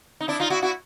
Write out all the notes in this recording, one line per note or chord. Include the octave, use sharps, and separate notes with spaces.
D#4
D4 E4
D#4 F4
E4 F#4
E4 F#4